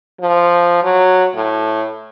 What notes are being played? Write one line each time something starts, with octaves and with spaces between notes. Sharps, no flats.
F3
F#3
A2